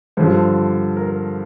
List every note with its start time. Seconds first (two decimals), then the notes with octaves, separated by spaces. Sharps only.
0.17 G2 D3 F3 C5
0.96 A#4